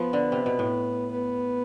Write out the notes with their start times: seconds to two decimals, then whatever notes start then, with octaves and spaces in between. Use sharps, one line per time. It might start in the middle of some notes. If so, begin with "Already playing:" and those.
Already playing: F3 B3
0.13 D3
0.32 C3
0.46 B2
0.59 A2
1.11 B3